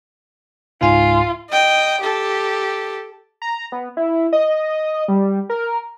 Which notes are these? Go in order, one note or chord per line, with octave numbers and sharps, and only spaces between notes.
C#2 G#2 F4 G#5
D#5 G5
G4 A4
A#5
B3
E4
D#5
G3
A#4